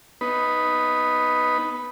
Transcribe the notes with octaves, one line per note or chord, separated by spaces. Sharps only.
B3 D#4 B4